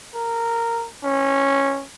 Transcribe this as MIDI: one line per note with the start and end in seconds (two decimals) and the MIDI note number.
0.14 0.87 70
1.04 1.84 61